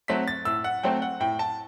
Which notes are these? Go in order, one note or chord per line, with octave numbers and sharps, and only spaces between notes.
F#3 A3 C4 B6
A6
A2 E6
F#5
F#3 A3 C4 G5
F#5
A2 G5
A5